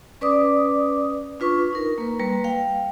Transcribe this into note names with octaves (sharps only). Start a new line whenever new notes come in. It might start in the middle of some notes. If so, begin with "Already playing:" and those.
C#4 B4 D5 D6 D#6
D4 F4 B4 C#6
D#4 A#4
A#3 B4
G3 A#3 B4
F5 G5